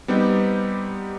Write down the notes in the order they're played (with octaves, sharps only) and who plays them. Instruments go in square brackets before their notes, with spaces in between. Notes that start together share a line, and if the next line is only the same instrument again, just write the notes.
[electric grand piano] G3 B3 C4 D#4 G4